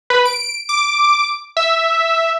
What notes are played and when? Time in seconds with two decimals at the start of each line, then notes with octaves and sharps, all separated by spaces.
0.10 B4
0.25 D7
0.69 D6
1.57 E5